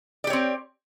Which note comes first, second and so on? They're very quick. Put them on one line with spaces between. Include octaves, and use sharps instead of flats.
D5 G4 C#5 C4